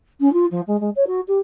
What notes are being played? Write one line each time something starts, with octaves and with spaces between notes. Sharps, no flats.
C#4
F4
F3
G#3
G#3
C#5
F#4
G4